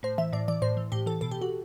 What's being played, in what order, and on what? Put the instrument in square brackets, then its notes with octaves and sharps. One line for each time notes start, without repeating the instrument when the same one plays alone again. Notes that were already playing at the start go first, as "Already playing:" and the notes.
[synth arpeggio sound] A2 C5
E3 E5
A2 D5
E3 D5
A2 C5
E3
A2 G4
E3 A4
B2 A4
G4
F#4